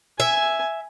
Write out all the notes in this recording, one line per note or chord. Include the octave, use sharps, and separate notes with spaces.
E5 G#5